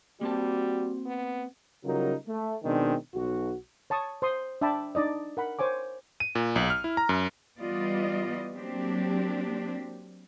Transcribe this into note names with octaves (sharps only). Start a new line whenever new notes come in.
G3 A#3 C4 F#4 A5
B3
C#3 F#3 G3 D#4 F4 A#4
A3
B2 D#3 G#3 C4 D4 D#4
B1 F#4
C#5 A5 C#6 D#6
C5 C6 D#6
D4 E5 G5 A5 B5 D6
D4 D#4 D5 D#5
A#4 F#5 B5
C5 C#5 G#5 D6
D#7
A#2
B1
F6
E4
A#5
F#2
E3 G3 B3 F4 D5 D#5
F#3 A#3 C4 D4 G4